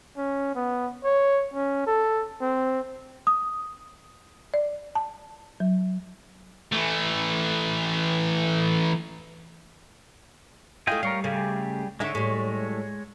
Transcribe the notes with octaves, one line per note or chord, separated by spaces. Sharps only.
C#4
B3
C#5
C#4
A4
C4
D#6
D5
A5
F#3
E3 A3
A3 E4 F4 G#4 D#5 G5
G3 A#4 C#5 F5
C#3 G3 A3 G4 G#4
D3 G#3 D#4 C#5 E5
A2 G3